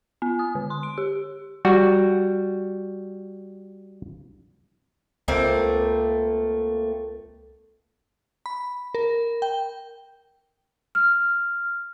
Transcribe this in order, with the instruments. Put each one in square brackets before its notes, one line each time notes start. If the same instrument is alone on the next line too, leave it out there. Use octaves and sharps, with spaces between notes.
[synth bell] B3
D#6
D3
C6
D7
G4
[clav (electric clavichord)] G3 F#4
[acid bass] C#2 [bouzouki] A3 A#3 C4
[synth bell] B5
A#4
G5
[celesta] F6